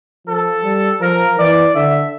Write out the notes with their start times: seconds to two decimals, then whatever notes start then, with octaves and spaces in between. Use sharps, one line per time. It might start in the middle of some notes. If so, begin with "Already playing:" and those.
0.27 F3 A4
0.63 G3
1.00 F3 A#4
1.38 E3 D5
1.75 D3 E5